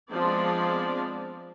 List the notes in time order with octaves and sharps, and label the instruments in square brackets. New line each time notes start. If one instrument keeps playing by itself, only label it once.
[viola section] F3 G#3 B3 C4 D4 D5